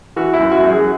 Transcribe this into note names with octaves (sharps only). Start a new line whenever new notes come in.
E3 F#4
E4
F#2
F#4
F#2
G#4